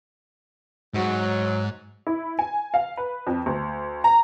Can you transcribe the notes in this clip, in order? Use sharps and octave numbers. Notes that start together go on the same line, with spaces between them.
G#2 F#3
E4
G#5
F5
B4
F2
D2
A#5